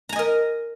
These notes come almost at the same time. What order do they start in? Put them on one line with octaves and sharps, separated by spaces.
A#5 G#5 D#5 A#4